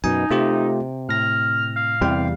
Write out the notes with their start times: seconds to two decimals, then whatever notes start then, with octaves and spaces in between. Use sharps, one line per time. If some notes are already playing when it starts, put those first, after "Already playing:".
0.04 F#2 B2 D#4 G#5
0.30 C3 A3 F4 G4
1.09 A2 F6 A#6
1.76 F5
2.01 E2 C3 E3 G3 G5